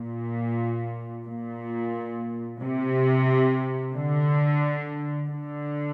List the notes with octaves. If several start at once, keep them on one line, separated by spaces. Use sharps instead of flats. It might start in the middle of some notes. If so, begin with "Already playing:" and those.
Already playing: A#2
A#2
C3
D3
D3